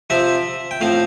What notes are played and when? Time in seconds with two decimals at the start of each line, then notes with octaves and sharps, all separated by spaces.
0.10 C3 F3 C4 E5
0.71 G5
0.81 A2 F3 C4 F5